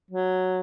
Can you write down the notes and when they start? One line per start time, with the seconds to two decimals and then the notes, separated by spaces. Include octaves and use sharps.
0.11 F#3